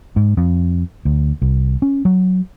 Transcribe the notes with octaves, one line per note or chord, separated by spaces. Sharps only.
G#2
F2
D2
C2
C#4
F#3